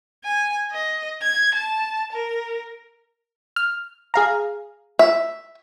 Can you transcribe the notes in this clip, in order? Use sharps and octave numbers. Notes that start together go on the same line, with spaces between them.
G#5
D#5
G#6
A5
A#4
F6
G#4 F5 A#5
E5